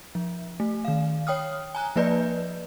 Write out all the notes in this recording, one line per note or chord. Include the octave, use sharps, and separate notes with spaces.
F3
A3
D#3 F5
C#5 G5 D#6 F6
G#5 A#5 F#6
F3 A#3 B4 D5 D#5 G6